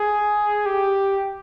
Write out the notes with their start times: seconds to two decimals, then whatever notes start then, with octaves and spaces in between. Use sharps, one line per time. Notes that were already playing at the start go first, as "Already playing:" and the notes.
Already playing: G#4
0.66 G4